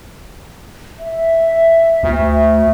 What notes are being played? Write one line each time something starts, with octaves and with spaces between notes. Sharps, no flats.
E5
D2